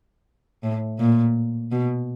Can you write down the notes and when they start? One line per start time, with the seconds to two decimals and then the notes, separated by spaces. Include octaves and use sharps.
0.63 A2
0.99 A#2
1.72 B2